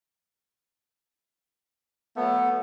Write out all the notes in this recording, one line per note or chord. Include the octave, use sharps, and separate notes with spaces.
F#3 A3 B3